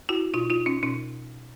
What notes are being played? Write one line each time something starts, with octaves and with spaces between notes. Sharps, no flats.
E4 F#4
B2 D#4 F4
D#4 F4
C#4 D#4
B2 C#4 D#4